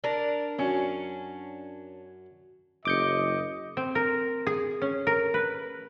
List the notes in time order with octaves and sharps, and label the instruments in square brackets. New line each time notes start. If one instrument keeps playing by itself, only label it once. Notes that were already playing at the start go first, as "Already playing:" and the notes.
[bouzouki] D4 A#4
[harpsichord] F#2 F#3 [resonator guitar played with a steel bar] C#4
[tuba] F#1 [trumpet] D#5 [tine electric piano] D6 G6 C#7
[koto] C4
A#4
G#4
C#4
A#4
B4